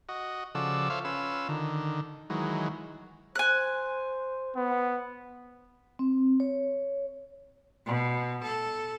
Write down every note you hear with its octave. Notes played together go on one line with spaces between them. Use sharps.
F#4 D#5
C#3 F3 F#4 A4 D5 E6
F4 A4 C5 C#5 E5 F5
C#4 F4 B4 E6
D3 D#3
D#3 E3 F#3 G#3
C5 G#5 F#6
B3
C4
C#5
B2
A4